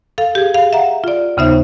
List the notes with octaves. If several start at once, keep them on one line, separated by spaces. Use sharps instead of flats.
A4 F5
G4 G#4
F5
E5 F#5 A#5
F4 D5
D#2 C#3 B3 D#4 C5 E5